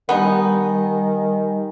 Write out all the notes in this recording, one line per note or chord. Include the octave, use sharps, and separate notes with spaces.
D#3 G3 B3 D#4 G4 G#5